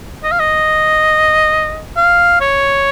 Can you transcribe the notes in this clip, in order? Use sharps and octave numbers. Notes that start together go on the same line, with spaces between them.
D#5
F5
D#5
F5
C#5